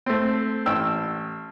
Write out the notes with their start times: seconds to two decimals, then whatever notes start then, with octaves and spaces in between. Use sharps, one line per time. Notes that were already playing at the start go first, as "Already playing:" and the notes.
0.06 A3 C4
0.66 A1 G5 E6